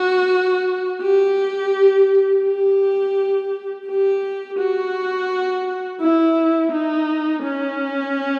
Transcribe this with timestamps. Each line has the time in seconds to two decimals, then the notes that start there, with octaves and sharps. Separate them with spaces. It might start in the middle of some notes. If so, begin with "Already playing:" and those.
Already playing: F#4
1.02 G4
2.45 G4
3.87 G4
4.59 F#4
6.01 E4
6.72 D#4
7.43 C#4